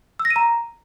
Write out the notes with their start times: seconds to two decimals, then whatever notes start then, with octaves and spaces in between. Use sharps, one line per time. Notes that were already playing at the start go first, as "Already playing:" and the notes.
0.19 E6
0.25 A#6
0.30 D#7
0.36 A#5